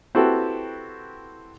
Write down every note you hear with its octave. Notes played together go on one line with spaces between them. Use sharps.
C4 E4 F#4 G4 A4 B4